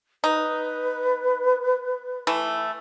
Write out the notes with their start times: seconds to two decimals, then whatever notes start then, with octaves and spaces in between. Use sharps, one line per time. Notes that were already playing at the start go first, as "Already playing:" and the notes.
0.24 D#4 B4
2.27 E3 A3